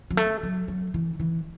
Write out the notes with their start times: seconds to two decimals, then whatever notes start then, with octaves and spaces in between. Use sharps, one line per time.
0.11 F#3
0.17 A3
0.43 F#3
0.68 F#3
0.94 E3
1.20 E3